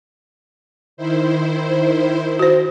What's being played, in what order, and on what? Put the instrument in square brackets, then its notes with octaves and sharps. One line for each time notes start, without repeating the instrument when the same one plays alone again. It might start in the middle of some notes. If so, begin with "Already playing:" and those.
[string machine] D#3 E4 C5
[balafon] F#4 C5